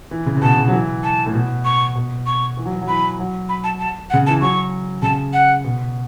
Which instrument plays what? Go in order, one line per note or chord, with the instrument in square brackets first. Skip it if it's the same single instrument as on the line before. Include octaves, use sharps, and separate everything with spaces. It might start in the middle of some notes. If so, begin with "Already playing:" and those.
[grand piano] E3
C#3
C#3
[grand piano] B2 [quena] A5
[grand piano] C#3
F#3
E3
[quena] A5
[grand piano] A2
B2
[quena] C#6
[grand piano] B2
[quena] C#6
[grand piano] E3
F#3
E3
F#3
[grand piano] E3 [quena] B5
[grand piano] F#3
[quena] B5
A5
A5
F#5
[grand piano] C#3
[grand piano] E3 [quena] A5
[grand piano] F#3 [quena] C#6
[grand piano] C#3 [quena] A5
[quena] F#5
[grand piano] B2